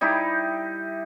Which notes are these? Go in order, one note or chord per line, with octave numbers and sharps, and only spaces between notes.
G3 D#4 E4 G4